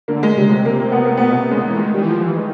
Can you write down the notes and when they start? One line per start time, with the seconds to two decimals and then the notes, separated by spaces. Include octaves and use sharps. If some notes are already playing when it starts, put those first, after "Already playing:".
0.08 D3 A#3
0.23 G#3
0.37 C#3 G3
0.51 C3 G#3
0.65 A#3
0.80 A#3
0.92 B3
1.05 A#3
1.17 B2 B3
1.30 A#3
1.37 C3
1.51 C#3 G#3
1.66 E3
1.74 A3
1.79 D#3 G#3
1.94 D#3 G3
2.02 E3
2.08 F3
2.22 E3
2.37 D#3 G#3